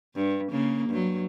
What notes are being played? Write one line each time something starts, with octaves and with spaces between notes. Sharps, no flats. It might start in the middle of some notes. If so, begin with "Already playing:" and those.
G2
C#3 A#3
G2 F#3